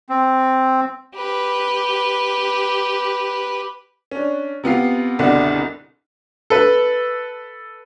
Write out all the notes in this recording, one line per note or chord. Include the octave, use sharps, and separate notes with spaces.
C4
G4 B4
C#4 D4
C3 B3 F4 C7
F#1 C2 B2 D3 D5 F#5
A4 B4